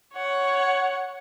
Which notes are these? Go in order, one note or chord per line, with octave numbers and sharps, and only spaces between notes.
C#5 F#5